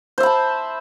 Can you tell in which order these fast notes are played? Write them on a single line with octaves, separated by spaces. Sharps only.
C5 E5 B5 A5